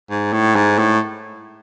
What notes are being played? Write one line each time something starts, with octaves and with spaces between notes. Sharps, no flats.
G#2
A2
G#2
A2